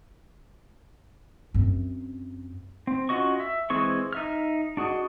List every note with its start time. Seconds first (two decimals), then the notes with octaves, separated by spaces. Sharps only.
1.54 F#2 C4
2.87 C4
3.09 C#4 F4 F#4 D#5 C#6
3.40 E5
3.70 E3 G#3 C4 G#4 C#6
4.13 D#4 E5 F6
4.77 D4 F#4 G#4 D#5